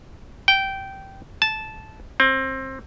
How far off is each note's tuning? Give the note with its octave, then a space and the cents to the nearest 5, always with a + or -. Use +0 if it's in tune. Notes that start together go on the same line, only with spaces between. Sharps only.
G5 -15
A5 -10
C4 +25